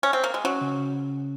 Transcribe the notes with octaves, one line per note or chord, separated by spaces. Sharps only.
C#4
C4
A#3
G#3
F#3 C#4
C#3